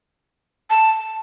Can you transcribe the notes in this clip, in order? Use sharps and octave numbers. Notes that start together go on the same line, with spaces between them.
A5